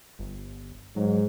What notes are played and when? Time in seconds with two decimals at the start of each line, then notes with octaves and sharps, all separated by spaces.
0.19 G1
0.96 G#2 F#3